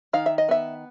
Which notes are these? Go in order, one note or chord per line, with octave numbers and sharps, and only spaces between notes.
D#3 F5
E5
D#5
B3 E5